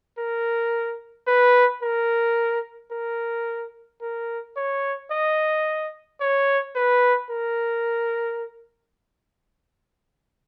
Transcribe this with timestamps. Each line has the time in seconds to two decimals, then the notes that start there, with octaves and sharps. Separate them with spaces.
0.18 A#4
1.27 B4
1.83 A#4
2.92 A#4
4.02 A#4
4.56 C#5
5.11 D#5
6.21 C#5
6.76 B4
7.30 A#4